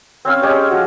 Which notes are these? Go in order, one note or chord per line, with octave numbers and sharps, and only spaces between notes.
C4 C#4 F5 E6
G#3 C#4 G4 C#5
F3 F#4